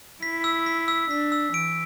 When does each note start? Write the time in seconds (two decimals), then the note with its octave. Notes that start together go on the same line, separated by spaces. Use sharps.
0.23 E4 B6
0.44 E6
0.66 B6
0.88 E6
1.10 D4 B6
1.32 E6
1.54 E3 D7